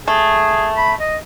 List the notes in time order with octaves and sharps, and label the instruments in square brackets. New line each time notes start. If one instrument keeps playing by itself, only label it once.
[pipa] A3 [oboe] G#4
[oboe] B5
D#5